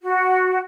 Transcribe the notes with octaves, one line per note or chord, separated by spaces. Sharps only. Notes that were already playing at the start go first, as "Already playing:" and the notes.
F#4